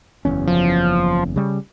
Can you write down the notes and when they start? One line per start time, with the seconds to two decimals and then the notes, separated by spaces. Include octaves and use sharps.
0.25 F#1 E2 C#4
0.48 F3
1.36 C#3 G3